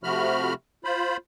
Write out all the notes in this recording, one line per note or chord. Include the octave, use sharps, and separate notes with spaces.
C3 F3 A3 F#4 B5 F6
F4 C5 B5